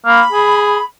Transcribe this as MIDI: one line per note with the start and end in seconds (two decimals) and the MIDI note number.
0.06 0.22 58
0.06 0.84 83
0.32 0.78 68